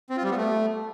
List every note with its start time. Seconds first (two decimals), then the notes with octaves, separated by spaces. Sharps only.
0.10 C4
0.17 F4
0.24 G3
0.30 B3
0.37 A3